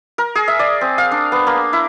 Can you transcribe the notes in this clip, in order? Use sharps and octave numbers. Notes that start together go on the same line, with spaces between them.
A#4
G#4
E5
D5
C4
F5
D4
B3
A#3
E4